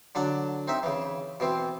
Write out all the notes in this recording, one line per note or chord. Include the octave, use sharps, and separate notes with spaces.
D3 F#3 D4 F#5
C4 D#4 E5
C#3 E3
B2 E3 C4